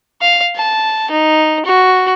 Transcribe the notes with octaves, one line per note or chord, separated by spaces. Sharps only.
F5
A5
D#4
F#4